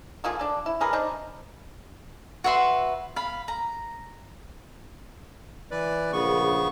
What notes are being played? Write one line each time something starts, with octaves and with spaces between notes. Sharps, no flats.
D3 A#3 F4 G#4
D4 A4
E4
D3 G#4 A#4 B4
C4 D4 D#4
F#4 B4 E5 C6
F5 B5
A#5
E3 B4 D5
A#1 C#3 B3 C#6